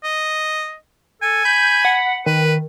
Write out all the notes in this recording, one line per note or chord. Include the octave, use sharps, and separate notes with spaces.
D#5
A4 G#5
B5 G6
F#5
D#3 B4